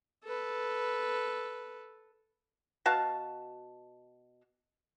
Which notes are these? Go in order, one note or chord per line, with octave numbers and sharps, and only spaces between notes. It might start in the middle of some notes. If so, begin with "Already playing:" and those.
A4 B4
B2 F#4 F5 A5